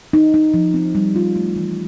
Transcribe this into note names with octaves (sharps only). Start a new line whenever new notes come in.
D#4
D#4
F3
C4
G3
F4
A3
E3